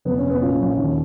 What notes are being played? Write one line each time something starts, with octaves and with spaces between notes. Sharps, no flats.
F1 B3
C#4
F1
B3
A#2 C#4
A#1
D#2